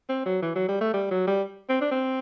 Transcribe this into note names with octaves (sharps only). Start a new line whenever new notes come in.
C4
F#3
E3
F#3
G3
A3
G3
F#3
G3
C4
D4
C4